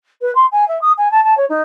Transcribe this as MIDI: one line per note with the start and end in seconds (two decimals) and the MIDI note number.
0.22 0.33 71
0.35 0.46 84
0.52 0.67 80
0.68 0.79 76
0.81 0.92 87
0.98 1.11 80
1.11 1.23 81
1.24 1.37 81
1.37 1.45 73
1.49 1.62 63